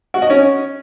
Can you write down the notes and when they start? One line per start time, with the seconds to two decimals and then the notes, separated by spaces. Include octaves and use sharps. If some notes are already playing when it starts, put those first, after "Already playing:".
0.14 F#4
0.22 D#5
0.30 C#4